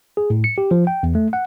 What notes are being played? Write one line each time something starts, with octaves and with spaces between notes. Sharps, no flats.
G#4
A2
C#7
G4
F3
G5
E2
A3
F#5